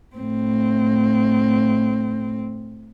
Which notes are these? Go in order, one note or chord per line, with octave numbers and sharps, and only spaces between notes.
A2 C4